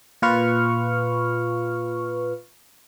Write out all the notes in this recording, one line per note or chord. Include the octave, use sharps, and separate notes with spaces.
A#2 F4 B4 C#6 F6